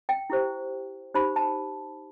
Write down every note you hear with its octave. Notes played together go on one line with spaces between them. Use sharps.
G5
E4 G4 C5
D#4 G4 C5 B5
A5